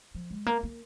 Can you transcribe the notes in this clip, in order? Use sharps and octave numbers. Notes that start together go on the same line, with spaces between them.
F3
G#3
A#3
A#3